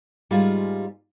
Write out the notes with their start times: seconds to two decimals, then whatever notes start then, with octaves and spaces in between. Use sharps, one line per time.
0.31 G#2 G3 A#3 F4 G#4